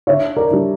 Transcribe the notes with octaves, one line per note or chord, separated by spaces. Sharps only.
D3 C#5 E5
A#4 D5
G3 D4